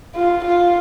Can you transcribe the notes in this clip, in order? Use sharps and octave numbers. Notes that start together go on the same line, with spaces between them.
F4
F4